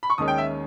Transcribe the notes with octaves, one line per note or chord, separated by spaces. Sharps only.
B5
C#6
D#2 D#3 G#3 C#4 D#6
G5
E5